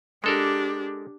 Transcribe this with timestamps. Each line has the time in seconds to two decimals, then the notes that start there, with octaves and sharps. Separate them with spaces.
0.24 G#3 D4 G4 A4 A#4